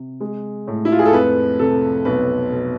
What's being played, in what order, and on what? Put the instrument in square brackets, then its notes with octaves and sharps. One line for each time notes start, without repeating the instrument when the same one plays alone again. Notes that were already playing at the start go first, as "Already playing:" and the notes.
Already playing: [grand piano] C3
G#3
A2
E4
F4
G#4
A4
F2 B4
C3 A4
B1 B4
B2